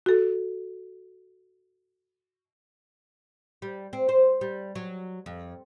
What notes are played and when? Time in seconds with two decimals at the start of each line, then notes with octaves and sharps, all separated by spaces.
0.06 F#4 A4
3.62 G3
3.93 C4
4.09 C5
4.41 G3
4.75 F#3
5.26 F2